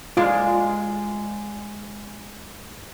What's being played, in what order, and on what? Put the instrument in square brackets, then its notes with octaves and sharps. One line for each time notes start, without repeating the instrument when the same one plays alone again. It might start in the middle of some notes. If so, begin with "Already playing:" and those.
[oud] G#3 D5 [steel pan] F4